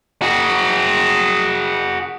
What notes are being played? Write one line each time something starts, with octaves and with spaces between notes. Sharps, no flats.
F#4 G#4